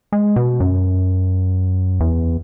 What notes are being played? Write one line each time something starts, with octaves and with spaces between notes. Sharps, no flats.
G#3
B2
F#2
E2